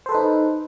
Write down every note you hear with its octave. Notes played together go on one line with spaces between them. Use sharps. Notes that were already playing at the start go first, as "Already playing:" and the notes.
D#4 A4 B4 C5